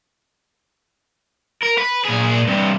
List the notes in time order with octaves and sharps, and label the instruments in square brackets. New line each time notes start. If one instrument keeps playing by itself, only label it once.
[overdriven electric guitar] A#4
B4
A#2 G#4
G2 C3